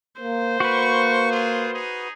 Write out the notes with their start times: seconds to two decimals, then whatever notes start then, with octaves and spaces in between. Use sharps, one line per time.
0.20 A#3 C5
0.60 A#3 F#4 B4 C#6
1.32 F4 G#4
1.74 D#4 G#4